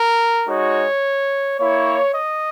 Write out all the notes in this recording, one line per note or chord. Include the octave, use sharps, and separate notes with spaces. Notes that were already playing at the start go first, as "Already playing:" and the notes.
Already playing: A#4
G#3 D#4 F#4 C#5
A#3 E4 C#5
D#5